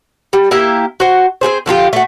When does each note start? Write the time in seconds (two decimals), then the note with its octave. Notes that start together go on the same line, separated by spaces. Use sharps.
0.33 G3
0.51 A#3 E4 G4 E5
1.00 F#4 C5
1.41 C4 F4 G#4 C5
1.66 D3 F3 F4 G4
1.93 A3 F#4